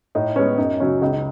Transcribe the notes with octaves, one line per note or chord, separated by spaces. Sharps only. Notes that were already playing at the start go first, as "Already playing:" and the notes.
A2 D#4
G#3 B3 C#4
F#2 D#4
C#3 F#3 C#4
C#2 D#4
D#4